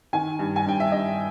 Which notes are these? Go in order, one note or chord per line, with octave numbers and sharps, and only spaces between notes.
D#3 G#5
G2
G#5
G2 G5
E5
G2 D#5